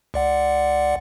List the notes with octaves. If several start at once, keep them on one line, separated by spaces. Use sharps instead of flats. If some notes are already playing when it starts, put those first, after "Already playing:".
C#2 D5 F#5